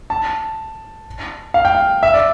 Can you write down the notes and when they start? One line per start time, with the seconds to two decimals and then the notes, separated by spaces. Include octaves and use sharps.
0.10 A5
1.54 F5
1.65 G5
1.75 F5
2.03 E5
2.14 D5